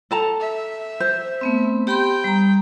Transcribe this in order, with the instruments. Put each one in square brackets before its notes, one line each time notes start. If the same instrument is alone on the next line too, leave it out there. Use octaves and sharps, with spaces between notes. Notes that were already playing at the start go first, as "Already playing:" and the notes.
[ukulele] A4 A5 A#5
[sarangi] E5
[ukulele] C5
[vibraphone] A3 B3 C4
[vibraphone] G4 B5 C6 [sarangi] G5
[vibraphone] G3 A#5